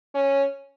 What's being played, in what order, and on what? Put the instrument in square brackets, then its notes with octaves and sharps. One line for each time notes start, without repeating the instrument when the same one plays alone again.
[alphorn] C#4